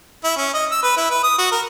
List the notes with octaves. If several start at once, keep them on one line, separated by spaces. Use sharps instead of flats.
E4
C#4
D#5
E6
B4
E4
B4
D#6
F#4
A#4